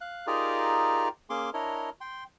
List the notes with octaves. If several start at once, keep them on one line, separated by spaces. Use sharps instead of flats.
F5 F#6
D#4 F4 G4 G#4 A#4 D5
A#3 C#4 G#4 C6 D6
D4 E4 A#4 C#5 D#5
G5 C6